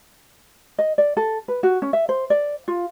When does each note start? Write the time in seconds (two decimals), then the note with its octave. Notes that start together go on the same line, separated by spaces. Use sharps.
0.78 D#5
0.98 D5
1.17 A4
1.48 B4
1.63 F#4
1.82 C#4
1.93 E5
2.09 C5
2.30 D5
2.68 F4